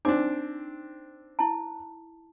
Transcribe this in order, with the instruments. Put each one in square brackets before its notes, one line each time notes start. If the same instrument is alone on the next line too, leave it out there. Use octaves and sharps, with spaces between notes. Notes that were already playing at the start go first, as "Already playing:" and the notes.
[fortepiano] C4 D4 [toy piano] D#4 D6
[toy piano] E4 A5